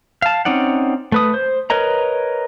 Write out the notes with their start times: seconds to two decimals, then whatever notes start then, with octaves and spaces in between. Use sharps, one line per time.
0.22 F5 A5
0.45 C4 C#4 D#4 D5 F#5
1.12 A3 B4 D#6
1.34 C5
1.70 A#4 B4 C#5 D#5 A#5